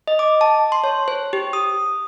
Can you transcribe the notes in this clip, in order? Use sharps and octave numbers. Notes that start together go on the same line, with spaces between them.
D#5
D6
A5
C6
C#5
C5
G4
D#6